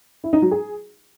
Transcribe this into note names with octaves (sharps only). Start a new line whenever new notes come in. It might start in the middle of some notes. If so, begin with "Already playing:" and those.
E4
D#4
F#3
G#4